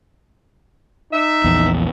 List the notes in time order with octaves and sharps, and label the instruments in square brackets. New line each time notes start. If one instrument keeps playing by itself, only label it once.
[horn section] D#4 E5
[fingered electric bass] A#1 E2